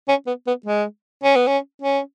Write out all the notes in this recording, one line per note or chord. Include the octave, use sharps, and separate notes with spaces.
C#4
B3
B3
G#3
C#4
B3
C#4
C#4